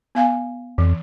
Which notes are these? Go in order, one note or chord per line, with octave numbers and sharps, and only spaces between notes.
B3 F5 G#5
F2 E3